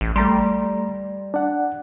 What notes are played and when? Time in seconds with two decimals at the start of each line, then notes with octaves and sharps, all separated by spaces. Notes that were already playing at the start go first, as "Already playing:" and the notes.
0.01 A1
0.16 G3 A3 A#5 C6
1.34 D4 F#5